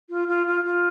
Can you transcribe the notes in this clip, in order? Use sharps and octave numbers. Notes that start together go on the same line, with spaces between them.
F4
F4
F4
F4